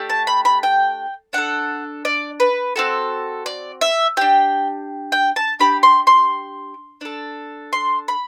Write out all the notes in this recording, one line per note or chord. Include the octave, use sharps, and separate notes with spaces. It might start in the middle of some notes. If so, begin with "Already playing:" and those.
Already playing: A3 D4 G4
A5
B5
B5
G5
D4 A4 F#5
D5
B4
C4 F#4 A4
D5
E5
D4 G4 G5
G5
A5
D4 G4 B5
C6
C6
D4 A4
C6
B5